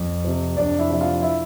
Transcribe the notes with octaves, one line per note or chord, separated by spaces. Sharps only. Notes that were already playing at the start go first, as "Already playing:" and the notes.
Already playing: F2
C3 F3
F2 D4 D5
E4 E5
C3 F3 E5
F4 F5
E4 E5